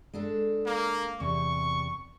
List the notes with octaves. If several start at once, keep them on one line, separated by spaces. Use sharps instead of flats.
G#3 D4 A4
A#3
E2 C3 C#6